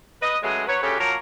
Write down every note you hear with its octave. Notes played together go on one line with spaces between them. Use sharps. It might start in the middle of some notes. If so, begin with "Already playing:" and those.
B4 D#5
A2 C#3 E3 F#3 G#3 G#4
F#3 B4 C#5
D2 C#3 F#4 G4 A4 C#5
F3 F#3 A#3 A#4 C#5